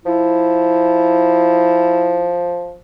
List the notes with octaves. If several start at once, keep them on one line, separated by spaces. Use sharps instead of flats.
F3 E4